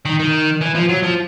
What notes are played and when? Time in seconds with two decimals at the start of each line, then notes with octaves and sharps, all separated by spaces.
0.05 D#3
0.20 D#3
0.61 E3
0.76 F3
0.89 F#3
1.03 F3